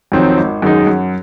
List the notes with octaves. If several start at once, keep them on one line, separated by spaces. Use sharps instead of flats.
F2 D#3 F#3 C4
G#1
F#2 D#3 G#3 D#4
F#2